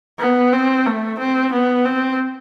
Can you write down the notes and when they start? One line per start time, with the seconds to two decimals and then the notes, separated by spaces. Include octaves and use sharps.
0.19 B3
0.52 C4
0.86 A3
1.19 C4
1.52 B3
1.85 C4